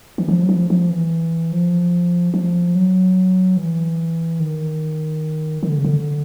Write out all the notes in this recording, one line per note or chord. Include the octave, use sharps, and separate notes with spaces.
E3
F3
F#3
F3
F3
E3
F3
F3
F#3
E3
D#3
D#3
D3
C#3
D3